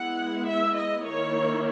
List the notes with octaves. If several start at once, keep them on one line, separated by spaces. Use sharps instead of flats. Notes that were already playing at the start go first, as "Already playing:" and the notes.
Already playing: G#3 B3 E4 F#5
E5
D#5
D#3 A#3 E4 C#5